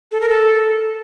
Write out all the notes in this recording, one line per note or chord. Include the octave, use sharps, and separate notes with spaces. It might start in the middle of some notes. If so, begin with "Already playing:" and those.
A4
A#4
A4